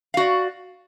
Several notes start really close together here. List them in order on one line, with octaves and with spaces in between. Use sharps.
F5 F#4 D5